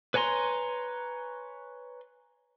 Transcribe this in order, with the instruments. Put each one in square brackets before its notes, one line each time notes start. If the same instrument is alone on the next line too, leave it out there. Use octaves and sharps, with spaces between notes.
[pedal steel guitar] B4 C#5 G#5 A#5 C6